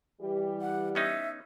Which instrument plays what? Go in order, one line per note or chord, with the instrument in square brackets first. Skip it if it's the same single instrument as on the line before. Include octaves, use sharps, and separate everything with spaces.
[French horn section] E3 G3 G4
[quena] F#5
[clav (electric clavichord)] B3 C#4 D#4 [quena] E5